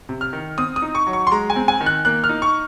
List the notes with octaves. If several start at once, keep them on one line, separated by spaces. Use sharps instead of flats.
C3
F6
D#3
C4 D#6
D#6
D#4
C#6
F#3
C#6
C6
G#3 A#5
G#5
C4
G#5
D#3
F#6
A#3 F#6
F6
D#4
C#6